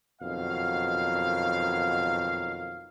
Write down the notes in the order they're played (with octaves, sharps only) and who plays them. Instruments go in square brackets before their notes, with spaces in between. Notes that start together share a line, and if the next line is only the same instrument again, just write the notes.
[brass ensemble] F#1 F2 B2 D#3 F#3 F5